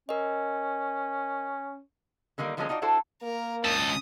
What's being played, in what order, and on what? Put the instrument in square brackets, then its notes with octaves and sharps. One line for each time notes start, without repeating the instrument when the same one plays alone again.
[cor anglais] C#4 [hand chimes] A#4 D#5
[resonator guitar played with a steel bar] D3 D#3 G3 A#3
D3 F3 F#3 G#3 A#3 C#4
D#4 F4 F#4 D5
D4 E4 F#4 A4 C5
[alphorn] A#3 [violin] A#4
[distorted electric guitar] C#2 A4 [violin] D#6